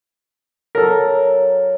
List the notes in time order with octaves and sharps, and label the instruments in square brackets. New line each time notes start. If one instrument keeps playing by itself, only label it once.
[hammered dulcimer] F#3 [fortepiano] A4 A#4